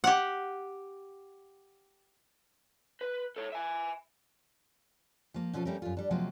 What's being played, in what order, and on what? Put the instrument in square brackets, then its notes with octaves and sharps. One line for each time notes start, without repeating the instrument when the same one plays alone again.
[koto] G4 F#5
[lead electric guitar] B4
A4 C#5
E5 G#5
[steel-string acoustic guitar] F3 A#3
B2 F3 C#4 E4 F4 A4
G3 A3 C#4 A#4
F#2 F4
G3 D4
C3 F3 F#3 G#3 A#3